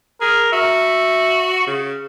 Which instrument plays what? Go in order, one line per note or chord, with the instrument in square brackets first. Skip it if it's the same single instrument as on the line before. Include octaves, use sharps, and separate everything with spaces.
[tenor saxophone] G#4 [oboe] A#4
[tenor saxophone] F#4 [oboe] E5
[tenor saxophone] C#3